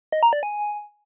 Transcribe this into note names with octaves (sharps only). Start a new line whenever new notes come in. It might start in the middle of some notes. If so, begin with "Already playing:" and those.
D#5
A#5
D5
G#5